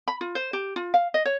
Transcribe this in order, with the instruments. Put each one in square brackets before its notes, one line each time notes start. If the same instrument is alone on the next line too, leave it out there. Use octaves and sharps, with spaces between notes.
[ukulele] B5
F4
C5
G4
F4
F5
D#5
C#5